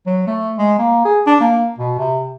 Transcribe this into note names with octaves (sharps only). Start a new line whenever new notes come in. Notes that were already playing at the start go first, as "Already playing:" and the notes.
F#3
A3
G#3
A#3
G#4
D4
A#3
B2
C3